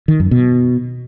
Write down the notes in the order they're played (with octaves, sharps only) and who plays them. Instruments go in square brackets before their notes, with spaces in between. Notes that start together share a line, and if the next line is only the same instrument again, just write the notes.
[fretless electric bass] D#3
F#2
B2